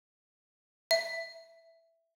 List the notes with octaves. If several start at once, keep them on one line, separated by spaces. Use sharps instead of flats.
E5